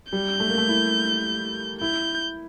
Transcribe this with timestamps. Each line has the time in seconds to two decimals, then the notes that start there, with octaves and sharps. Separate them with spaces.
0.13 G3 G6
0.40 A3
0.49 A#3
0.58 A3
0.69 E4
1.81 E4 G6